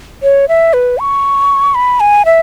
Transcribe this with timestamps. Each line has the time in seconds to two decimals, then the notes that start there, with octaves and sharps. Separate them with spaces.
0.23 C#5
0.48 E5
0.73 B4
0.99 C#6
1.75 B5
2.00 G#5
2.25 E5